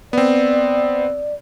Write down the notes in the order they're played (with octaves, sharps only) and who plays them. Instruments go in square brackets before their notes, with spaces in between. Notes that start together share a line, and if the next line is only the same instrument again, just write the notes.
[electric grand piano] B3 C4 [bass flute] D5